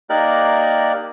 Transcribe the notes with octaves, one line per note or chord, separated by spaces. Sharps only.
A#3 D#4 G4 A#4 D5 F#6